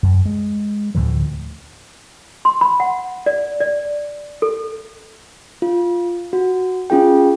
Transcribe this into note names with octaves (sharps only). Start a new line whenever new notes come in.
F#2
G#3
D2 A2 D3 F3
C6
B5
F#5
D5
D5
A4
F4
F#4
C#4 F4 G#4 G5